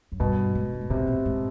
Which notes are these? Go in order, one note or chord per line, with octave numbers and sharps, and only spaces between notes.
F#2
G2 B2
G#2
G2
G#2
A2 C3
A#2
G#2